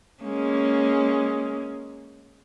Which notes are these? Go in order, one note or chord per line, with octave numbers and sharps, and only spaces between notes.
G#3 A#3 C#4